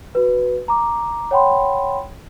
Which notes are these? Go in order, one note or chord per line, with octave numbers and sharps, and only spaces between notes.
F#4 B4
A#5 D6
C#5 F#5 G5 B5 C6